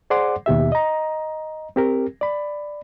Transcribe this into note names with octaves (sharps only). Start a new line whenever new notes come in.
G#4 C5 D5 F#5 C6 D6
D#2 B2 G4 E5
D#5 A#5
C4 G4 A#4
D5 B5